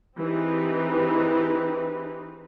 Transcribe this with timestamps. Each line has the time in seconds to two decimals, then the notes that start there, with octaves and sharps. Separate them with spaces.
0.18 E3 C4 D#4 G4 G#4 B4